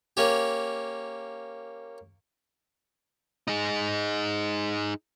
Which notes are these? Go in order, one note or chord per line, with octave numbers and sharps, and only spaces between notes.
A#3 C#4 G4
D#4 G#4